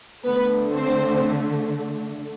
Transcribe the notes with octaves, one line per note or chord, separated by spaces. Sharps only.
D3 A3 B3 B4
C4 C5